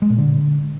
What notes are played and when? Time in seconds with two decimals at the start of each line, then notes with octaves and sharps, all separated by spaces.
0.02 G#3
0.10 A#2
0.18 D3